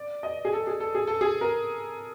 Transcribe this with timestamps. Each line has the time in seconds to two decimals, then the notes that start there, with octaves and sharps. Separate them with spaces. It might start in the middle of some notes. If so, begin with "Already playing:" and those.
Already playing: D5
0.23 D#5
0.45 G#4
0.53 A4
0.67 G#4
0.80 A4
0.95 G#4
1.07 A4
1.21 G#4
1.41 A#4